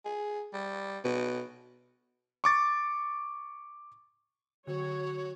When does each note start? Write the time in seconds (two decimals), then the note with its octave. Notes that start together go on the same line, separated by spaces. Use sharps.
0.05 G#4
0.54 G3
1.05 B2
2.44 C#6 D6 A6
4.67 D3 F#3 F#4 C#5